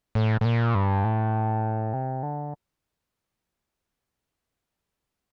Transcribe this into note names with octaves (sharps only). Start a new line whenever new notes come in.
A2
A2
A#2
G2
A2
C3
D3